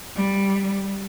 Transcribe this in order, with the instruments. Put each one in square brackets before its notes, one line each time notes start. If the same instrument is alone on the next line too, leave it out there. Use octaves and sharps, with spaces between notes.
[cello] G3